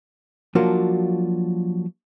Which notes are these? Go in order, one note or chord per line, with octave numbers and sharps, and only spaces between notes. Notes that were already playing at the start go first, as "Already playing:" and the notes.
F3 F#3 A#3 D4 F4 F#4